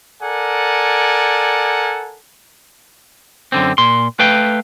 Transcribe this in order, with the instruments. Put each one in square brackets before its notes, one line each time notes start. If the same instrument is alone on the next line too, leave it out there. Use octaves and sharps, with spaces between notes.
[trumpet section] A4 A#4 D5 F#5 G#5
[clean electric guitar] F#2 D3 C4
A#2 C6
A3 B4 F5 G5